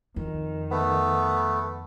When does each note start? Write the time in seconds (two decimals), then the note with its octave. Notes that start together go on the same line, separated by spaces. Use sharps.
0.16 F2 D#3
0.71 A3 B3